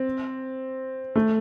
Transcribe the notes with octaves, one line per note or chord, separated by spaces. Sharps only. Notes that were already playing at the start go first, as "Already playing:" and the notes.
Already playing: C4
A3